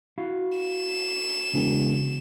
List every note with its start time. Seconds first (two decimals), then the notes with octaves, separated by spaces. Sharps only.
0.18 E4 F#4 F5
0.58 E7
1.54 E1 C#3